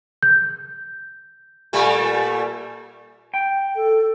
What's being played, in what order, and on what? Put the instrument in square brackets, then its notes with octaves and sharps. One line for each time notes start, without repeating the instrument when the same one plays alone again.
[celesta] G6
[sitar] A#2 G3 A3
[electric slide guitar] G5
[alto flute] A4